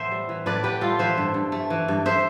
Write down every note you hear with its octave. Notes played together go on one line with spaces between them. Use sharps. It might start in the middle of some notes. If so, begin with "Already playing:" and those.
Already playing: A2 E3 B3 C5 E5
G3
E3
A2 B4 D5
B3 G4 B4
G3 F4 A4
E3 C5 E5
G2
G2
A3
E3
G2
C5 E5